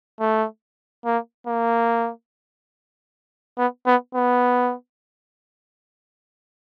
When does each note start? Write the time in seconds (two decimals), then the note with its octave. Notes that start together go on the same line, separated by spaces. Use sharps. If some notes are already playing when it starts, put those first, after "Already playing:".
0.20 A3
1.05 A#3
1.47 A#3
3.58 B3
3.87 B3
4.15 B3